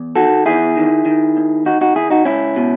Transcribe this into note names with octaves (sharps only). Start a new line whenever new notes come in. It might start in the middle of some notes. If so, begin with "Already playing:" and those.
Already playing: E2
D#3 F#4 A4
E2 E4 G#4
D#3
D#3
D#2
D#2 D#4 F#4
D#4 F#4
D#2 E4 G#4
D#4 F#4
C#2 C#4 E4
B2